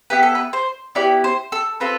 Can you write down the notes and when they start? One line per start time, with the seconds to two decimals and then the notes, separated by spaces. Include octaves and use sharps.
0.10 B3 E4 G4 B4
0.23 A4
0.35 B4
0.53 C5
0.95 B3 E4 G4 D5
1.24 C5
1.52 A4
1.80 C4 F4 A4 B4